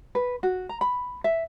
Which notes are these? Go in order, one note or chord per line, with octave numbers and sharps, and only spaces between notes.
B4
F#4
A#5
B5
E5